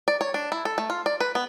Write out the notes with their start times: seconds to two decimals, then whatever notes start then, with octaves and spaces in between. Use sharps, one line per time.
0.08 D5
0.21 C#5
0.34 D4
0.52 E4
0.65 A4
0.78 A3
0.90 F4
1.06 D5
1.20 B4
1.35 B3